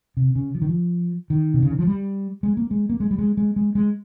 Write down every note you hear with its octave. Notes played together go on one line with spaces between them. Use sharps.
C3
C#3
F3
D#3
F3
D#3
C3
C#3
D#3
F3
G3
G#3
A#3
G#3
A#3
G#3
G3
G#3
G#3
G#3
G#3